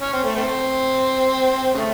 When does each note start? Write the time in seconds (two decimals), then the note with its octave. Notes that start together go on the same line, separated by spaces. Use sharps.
0.02 C#4
0.13 C4
0.24 A3
0.36 A3 C4
1.74 C#3 A3